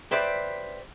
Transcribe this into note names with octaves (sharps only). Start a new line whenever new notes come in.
G4 B4 C5 D5 E5